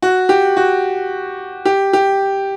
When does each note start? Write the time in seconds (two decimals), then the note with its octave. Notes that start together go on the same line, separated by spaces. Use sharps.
0.02 F#4
0.29 G4
0.57 F#4
1.65 G4
1.93 G4